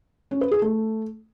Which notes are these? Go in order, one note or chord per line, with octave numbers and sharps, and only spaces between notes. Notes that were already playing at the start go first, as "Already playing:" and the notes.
C#4
B4
G#4
A3